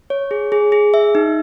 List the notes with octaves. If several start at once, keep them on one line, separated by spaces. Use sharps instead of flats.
C#5
G#4
G#4
G#4
E5
D#4